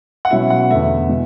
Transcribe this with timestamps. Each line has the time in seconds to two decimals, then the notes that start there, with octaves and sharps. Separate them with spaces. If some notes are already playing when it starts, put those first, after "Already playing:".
0.25 F#5
0.30 B2 F#3 C#4 E4 E5
0.50 F#5
0.70 E2 D3 A3 E5
1.09 B2